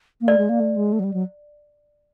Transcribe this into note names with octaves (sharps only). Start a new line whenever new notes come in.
A#3
A3 D5
G#3
A#3
A3
G#3
A3
F#3
G3
F#3